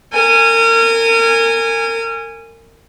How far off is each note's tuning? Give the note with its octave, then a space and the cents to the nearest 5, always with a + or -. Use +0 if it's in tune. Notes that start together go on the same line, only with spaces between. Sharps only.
A#4 -35 G#5 -10